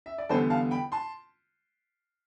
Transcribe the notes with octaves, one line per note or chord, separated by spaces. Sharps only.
E5
D5
E2 D3 G3 B3 A4 C5
F5 A5
G5 B5
A5 C6